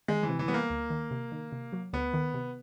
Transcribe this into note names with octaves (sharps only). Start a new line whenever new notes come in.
D#3 G#3
E3
C3
E3
G3 B3
A#3
D2
D#3
C3
D#3
C3
F#3
D2 B3
D#3
C3